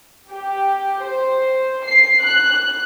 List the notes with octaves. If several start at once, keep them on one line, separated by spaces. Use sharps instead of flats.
G4
C5
C7
F#6